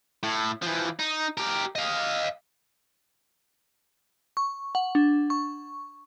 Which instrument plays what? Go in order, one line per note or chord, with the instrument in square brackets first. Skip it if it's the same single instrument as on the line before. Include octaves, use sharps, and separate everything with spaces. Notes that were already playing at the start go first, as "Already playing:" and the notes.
[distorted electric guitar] A2
E3 F3
D#4
G4 A#4
D#5 F5
[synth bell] C#6
F#5
D4
C#6